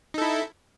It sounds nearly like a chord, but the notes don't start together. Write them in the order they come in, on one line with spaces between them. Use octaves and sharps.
D#4 A4 E4